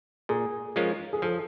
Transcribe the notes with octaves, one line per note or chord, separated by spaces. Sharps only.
A#2 G#4
F3 G#3 C#4 F4 A#4
G#4
F3 A4